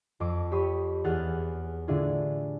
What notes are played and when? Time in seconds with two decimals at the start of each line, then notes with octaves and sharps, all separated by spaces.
0.20 F2 C6 D6
0.51 G4 C#5 B5 C6 D#6
1.04 E2 G#4 F#5 F6 A6
1.88 A2 D3 D4 E4 F4 G#4